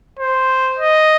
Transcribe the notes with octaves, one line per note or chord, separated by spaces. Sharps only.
C5
D#5